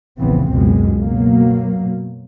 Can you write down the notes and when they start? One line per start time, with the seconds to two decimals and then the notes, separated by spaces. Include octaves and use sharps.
0.18 F1 A#1 C#3 E3 B3 C4
0.51 F#1 C#2 F#2 B2 G#3
1.02 B2 F#3 A#3